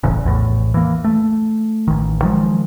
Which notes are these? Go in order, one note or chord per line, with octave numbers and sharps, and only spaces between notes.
E1 A1 E2 C#3
A#1 E2 A2
E3 A#3
A3
A1 D#3
D#3 F3 F#3 G#3